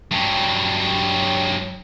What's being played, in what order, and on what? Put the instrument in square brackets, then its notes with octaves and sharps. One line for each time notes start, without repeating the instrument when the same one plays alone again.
[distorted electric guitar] G2 F#3